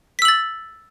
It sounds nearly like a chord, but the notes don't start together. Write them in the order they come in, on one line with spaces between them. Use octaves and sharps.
B6 E6 F#7 A6